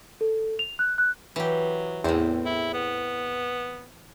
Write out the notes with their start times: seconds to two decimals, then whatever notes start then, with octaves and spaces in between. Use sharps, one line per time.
0.21 A4
0.59 F7
0.79 F#6
0.98 F#6
1.36 E3 F#3 G4
2.04 E2 A2 C4
2.45 E4
2.74 B3